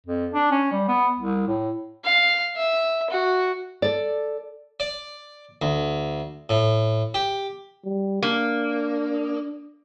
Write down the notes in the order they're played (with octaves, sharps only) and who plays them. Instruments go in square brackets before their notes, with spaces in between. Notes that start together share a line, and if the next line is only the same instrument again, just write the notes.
[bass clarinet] F2
D4
C#4
G3
B3
C2
A2
[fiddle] F5
E5
F#4
[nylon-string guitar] A4 D5
[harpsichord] D5
D2
A2
G4
[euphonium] G3
[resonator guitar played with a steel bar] A#3 [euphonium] D4